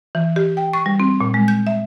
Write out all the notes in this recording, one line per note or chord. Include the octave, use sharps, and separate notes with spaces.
E3
G4
G5
C#6
G3
C4
A#2
G#3
G6
E5